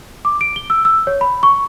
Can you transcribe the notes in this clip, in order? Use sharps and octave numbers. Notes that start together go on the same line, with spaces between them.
D6
D7
G7
E6
E6
C#5
B5
C#6